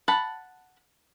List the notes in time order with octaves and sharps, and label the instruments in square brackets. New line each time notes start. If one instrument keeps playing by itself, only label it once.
[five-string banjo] F#5 A5 B5